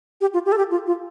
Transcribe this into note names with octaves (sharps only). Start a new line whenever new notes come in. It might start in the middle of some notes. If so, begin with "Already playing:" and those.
G4
F4
G4
A4
G4
F4
F4